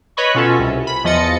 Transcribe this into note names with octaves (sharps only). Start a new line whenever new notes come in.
B4 C#5 D#5 B5 C#6
B2 C#4 F4 A4
C2
B5
E2 F3 D#5 A6 C#7